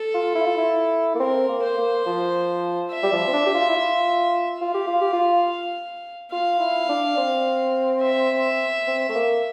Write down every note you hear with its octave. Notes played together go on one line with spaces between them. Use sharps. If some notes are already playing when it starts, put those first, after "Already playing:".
Already playing: A4
F4
E4
F4
E4
A#3
C4 A#4
A#3
C5
A#3
F3
E5
G3
F3
C4
D4
G4
F4
E4
F4
F4 F5
G4
F4
G4
F4
F4 F5
E4
D4
C4
E5
C4
A3
A#3